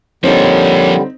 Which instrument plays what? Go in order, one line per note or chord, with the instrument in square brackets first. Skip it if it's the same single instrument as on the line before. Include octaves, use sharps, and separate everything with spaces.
[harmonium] D3 G3 [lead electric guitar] F3 A#3 [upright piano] C4 D#4 [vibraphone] C#5